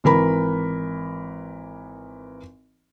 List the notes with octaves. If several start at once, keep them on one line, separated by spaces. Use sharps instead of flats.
G#1 E3 A#4 B5